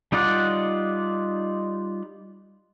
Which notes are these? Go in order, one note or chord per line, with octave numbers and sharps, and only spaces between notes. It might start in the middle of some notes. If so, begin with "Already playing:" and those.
G3 D#4 F4 D5 F#5